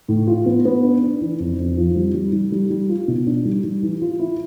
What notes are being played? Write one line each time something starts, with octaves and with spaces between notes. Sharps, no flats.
A2
F4
B3
B3
D4
D4
E3
F2
F2
F3
G3
G3
G3
G3
G3
F4
B2
D4
G3
G3
E3
F4
E4